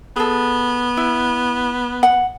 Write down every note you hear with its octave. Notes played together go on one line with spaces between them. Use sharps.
B3 G#4 A4
E4
F#5